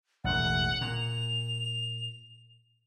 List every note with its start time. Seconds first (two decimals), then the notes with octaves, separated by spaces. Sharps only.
0.24 E1 A1 F#5
0.81 A#2 F7